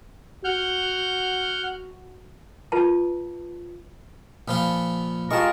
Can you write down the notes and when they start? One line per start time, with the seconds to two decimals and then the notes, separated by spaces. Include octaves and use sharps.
0.44 F#4 F#5 F6 G6
2.72 F4 B4 A5
4.48 A#2 F3 F4 B5
5.31 G#3 F4 G4 A#4 D#5 A5 C#6